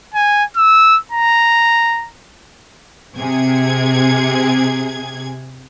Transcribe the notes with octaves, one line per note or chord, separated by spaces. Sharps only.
G#5
E6
A#5
C3 G#4 G#6